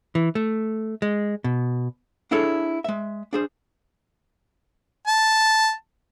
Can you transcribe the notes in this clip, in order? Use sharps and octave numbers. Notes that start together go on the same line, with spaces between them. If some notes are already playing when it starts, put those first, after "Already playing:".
E3
A3
G#3
B2
D4 E4 G#4 A4 C#5
G#3 E5
D4 G#4 C5
A5